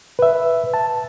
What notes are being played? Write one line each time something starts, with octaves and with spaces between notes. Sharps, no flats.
B4 E5
A5